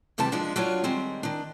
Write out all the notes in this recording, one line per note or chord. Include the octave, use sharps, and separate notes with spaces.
E2 C3 D#3 G3 A5
G2 F3 G#3 D4
F#3 D4 F4 A#4 C#5
D#3 G3 G#3 C4
D#3 D4